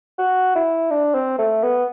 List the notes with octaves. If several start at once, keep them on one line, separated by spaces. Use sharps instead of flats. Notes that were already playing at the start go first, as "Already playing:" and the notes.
F#4
E4
D4
C4
A3
B3